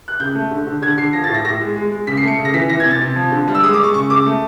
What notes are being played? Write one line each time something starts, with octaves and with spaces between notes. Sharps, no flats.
F#6
C#3 G6
A3
D3
D3
D3 G#6
D3 C7
F3 A#6
A6
A2
A#6
A2 A#6
G#3
G#3
G#3
C#3 B6
C7
A3
C#7
C#3
A#6
E3 B6
E3 A#6
G#6
C3
A6
C3
F3
D3
G3
E6
G#3 D#6
D6
G#3 C#6
C#3 C#6
C#3 D6
A3